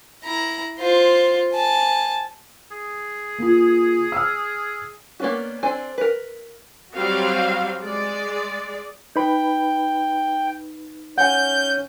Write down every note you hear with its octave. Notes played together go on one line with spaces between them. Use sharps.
E4 A#5
F4 C5
G#5 A5
G#4
A#3 F4
E6 F6
A#3 B3 C#4 D4 F#4
C4 D4 A4 C5 G#5
A#4 B4
F#3 G3 C4 F#4 F5
G#3 D5
D#4 B4 G5 B5
C#4 F#5 G#5 G6